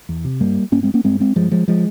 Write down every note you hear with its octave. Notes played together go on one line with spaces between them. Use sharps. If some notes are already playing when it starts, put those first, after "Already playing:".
E2
C3
G2 G3 A#3
G2 A#3 C#4
G#3 C4
A#3 C#4
G2 G#3 C4
G#3 C4
G2 F3 G#3
F3 G#3
F3 G#3